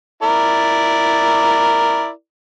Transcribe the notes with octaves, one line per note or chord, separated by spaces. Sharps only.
E4 A#4 D5